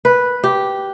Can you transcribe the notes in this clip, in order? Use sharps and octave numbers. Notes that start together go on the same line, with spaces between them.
B4
G4